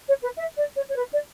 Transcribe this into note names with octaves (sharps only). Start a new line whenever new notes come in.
C#5
B4
E5
D5
C#5
C#5
B4
D5